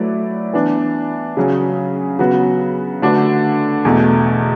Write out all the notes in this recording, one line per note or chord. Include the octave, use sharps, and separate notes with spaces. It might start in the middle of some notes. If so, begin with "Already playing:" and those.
Already playing: F#3 A3 E4 B4 D5
E3 B3 D4
C#3 F#3 C#4 G#4
C#3 F#3 B3 F#4
D3 A3 D4 F#4 B4
E2 B2 A3